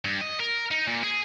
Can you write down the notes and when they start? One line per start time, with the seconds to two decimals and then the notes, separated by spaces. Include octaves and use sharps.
0.05 G2
0.21 D#5
0.40 A#4
0.71 D#4
0.88 A#2
1.04 G#4